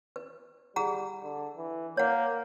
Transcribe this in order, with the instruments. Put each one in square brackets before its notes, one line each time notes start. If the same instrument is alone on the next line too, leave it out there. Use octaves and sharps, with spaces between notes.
[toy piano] B4
[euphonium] G3 [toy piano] G#4 F#5 A#5
[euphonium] D3
E3
[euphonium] A#3 [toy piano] C#5 F#5